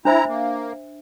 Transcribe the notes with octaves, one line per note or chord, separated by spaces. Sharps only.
D4 E4 C5 E5 A#5
A#3